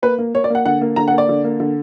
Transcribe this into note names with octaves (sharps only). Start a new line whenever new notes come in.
A#3 B4
A#3
A#3 C#5
D5
A#3 F#5
D3 F#5
A#3
D3 A#5
F#5
A#3
D5
D3
A#3
D3